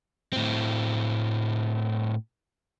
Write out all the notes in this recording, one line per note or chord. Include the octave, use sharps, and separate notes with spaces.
A2 C4